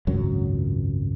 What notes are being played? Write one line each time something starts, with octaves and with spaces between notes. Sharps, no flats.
G#1 C#2 F#2 F#3